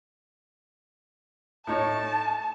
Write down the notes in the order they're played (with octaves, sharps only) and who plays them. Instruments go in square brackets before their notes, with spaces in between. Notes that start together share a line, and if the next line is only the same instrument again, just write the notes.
[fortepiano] A2 D#4 C#5 [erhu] A5